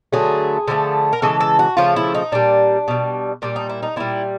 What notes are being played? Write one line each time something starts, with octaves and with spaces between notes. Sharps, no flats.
D3 F#3 A3 G#4
D3 F3 A3
A#4
C#3 E3 G#3 A4
A4
F#4
C#3 F3 A3 F4
E4
D#4
A#2 G3 D4
B2 G3
A#2 G3 D4
D#4
E4
D#4
A#2 G3 E4